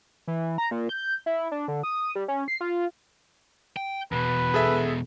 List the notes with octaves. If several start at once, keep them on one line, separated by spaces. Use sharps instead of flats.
E3
A#5
A#2
G6
E4
D4
D3
D#6
G3
C#4
C7
F4
G5
E2 B2 B4
G#4 A4 E5